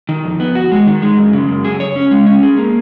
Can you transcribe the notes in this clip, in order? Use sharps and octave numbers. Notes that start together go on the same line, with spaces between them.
D#3
F2
B3
F#4
G#3
D#3
G#3
F#2
C#3
F#2
G#4
C#5
C#4
G#3
C#4
G#4
A#3